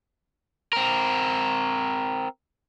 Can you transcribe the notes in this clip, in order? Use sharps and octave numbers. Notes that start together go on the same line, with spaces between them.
C4 A#4